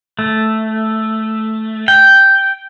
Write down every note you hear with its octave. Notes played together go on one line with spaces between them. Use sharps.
A3
G5